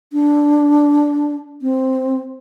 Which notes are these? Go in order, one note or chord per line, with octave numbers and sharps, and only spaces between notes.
D4
C4